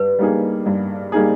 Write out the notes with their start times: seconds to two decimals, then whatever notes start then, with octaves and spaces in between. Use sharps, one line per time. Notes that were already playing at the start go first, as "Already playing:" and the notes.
Already playing: G2 B4
0.19 G3 A#3 D#4 G#4
0.66 G2
1.12 G3 A#3 D#4 G#4